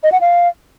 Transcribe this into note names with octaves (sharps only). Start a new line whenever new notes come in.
D#5
F#5
F5